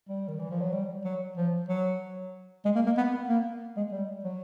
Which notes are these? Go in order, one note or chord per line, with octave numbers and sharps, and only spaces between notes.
G3
D#3
E3
F3
F#3
G3
F#3
F3
F#3
G#3
A#3
A#3
B3
B3
A#3
G#3
G3
F#3